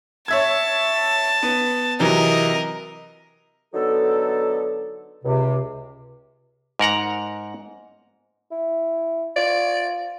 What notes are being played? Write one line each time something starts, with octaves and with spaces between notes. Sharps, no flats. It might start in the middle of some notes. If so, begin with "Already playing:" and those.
C#5 E5 A5 G#6
B3
C3 E3 F#3 A#4 D#5
D3 F#3 B3 D#4 A4
C#2 C3
G#2 A#4 F#5 A#5
E4
F4 D5